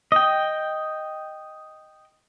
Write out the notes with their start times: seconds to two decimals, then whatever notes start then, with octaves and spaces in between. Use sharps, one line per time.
0.12 D#5 G5